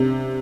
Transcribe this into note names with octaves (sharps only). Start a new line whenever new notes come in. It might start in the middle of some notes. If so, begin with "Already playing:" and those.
Already playing: C3 D4